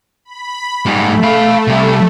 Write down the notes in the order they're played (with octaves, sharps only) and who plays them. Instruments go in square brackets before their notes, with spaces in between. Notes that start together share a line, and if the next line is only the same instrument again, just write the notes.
[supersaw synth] B5
[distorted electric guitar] G#2 G3 [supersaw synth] A3
[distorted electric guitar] F5 B5
C3 G3